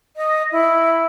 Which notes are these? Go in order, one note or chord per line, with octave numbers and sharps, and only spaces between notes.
D#5
E4